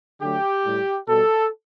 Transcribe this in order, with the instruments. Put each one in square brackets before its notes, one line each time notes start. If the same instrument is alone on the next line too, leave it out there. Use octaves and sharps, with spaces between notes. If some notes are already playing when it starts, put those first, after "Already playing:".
[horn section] D3 F#3 A3 G4
A2 G3
B2 G3 A4